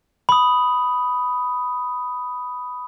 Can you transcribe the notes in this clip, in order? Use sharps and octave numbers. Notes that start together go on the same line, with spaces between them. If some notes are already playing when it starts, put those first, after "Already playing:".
B5 D#6